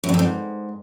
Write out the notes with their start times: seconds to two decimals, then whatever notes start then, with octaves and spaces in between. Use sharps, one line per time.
0.04 F#2
0.09 G2
0.14 F2
0.19 G#2